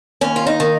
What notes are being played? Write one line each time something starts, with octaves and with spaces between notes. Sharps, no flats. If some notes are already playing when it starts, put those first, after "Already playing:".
D#2 C#4
F4
D#4
D#3